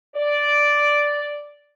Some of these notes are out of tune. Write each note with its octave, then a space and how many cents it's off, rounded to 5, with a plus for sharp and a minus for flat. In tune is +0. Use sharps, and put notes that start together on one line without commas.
D5 -5